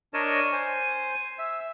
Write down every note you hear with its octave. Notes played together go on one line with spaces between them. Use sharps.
D4 A#4 C#5 D#5 A5
C5 G#5
E5